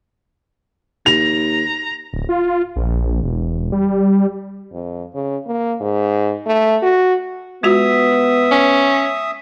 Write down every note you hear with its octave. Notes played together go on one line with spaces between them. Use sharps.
D#2 A#5 F7
D1
F4
A#1
E1
G3
F2
C#3
A#3
G#2
A3
F#4
G#3 B3 F4 F#4 E5 D#6
C#4